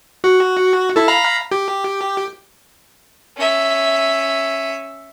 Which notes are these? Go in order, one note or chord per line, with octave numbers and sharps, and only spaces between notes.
F#4
E4 A4
F5 A#5 B5
G4
C#4 E5